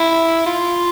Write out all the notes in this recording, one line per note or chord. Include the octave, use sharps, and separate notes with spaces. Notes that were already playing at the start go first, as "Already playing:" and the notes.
Already playing: E4
F4